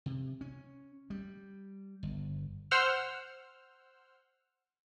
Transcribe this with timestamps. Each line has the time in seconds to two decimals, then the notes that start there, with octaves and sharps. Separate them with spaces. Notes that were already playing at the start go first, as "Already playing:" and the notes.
0.06 C3
0.41 C#4
1.10 G3
2.03 G1
2.71 C5 F#5 E6 F6